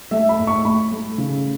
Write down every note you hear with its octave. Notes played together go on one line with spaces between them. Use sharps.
A3 E5
B5
A2
C#6
A2 B5
A3
C#3